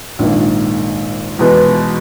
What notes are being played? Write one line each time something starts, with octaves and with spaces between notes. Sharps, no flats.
A#1 G#2 D#3 A#3
E2 B2 G#3 B3